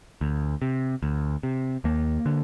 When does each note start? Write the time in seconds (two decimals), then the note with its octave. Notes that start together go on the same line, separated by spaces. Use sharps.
0.21 D2
0.62 C3
1.03 D2
1.43 C3
1.84 D#2 A#3
2.26 D3